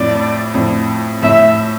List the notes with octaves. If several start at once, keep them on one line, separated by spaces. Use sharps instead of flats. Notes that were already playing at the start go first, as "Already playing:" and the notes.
Already playing: F2 A2 D5
F2 A2
F2 A2 E5